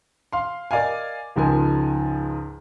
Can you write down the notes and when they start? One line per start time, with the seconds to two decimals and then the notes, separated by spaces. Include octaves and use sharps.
0.33 F5 C6
0.71 A#4 D5 D#5 F5 G#5
1.36 C#2 G#2 F3 A#4 G#5